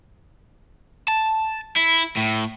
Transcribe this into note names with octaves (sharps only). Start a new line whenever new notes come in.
A5
E4
A2